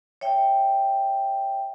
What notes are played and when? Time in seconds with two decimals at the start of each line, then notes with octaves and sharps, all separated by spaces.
0.21 C#5 E5 G5